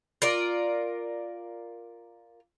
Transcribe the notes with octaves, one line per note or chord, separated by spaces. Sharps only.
F4 A#4 D5